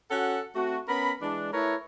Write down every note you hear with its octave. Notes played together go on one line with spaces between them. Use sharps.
C#4 F#4 A4 F#5
A3 C4 F#4
B3 C#4 A#4 B5
E3 G#3 D4
A3 E4 A#4 B4 C#5